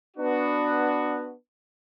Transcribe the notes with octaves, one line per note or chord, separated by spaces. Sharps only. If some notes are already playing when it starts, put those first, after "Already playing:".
B3 D4 F#4